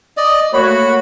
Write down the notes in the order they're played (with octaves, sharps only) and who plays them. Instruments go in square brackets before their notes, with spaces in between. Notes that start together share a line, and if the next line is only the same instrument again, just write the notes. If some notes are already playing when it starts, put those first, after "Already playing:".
[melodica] D5 D#5
[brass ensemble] A3 A#3 F#4 [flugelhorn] C#5 [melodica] B5